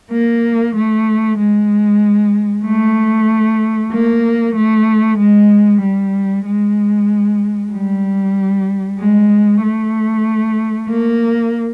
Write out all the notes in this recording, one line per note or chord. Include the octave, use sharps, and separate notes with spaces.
A#3
A3
G#3
A3
A#3
A3
G#3
G3
G#3
G3
G#3
A3
A#3